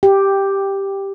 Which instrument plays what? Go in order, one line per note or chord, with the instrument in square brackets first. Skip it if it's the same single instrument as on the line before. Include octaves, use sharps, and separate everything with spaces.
[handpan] G4